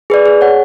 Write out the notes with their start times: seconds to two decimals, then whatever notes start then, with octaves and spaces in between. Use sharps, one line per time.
0.10 G#4 B4 D5
0.26 G#4
0.41 C#5 F#5